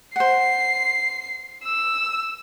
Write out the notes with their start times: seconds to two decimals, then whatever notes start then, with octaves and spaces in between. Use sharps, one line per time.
0.16 C5 F#5 C7
1.64 E6